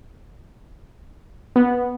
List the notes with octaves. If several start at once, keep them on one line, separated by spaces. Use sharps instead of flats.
B3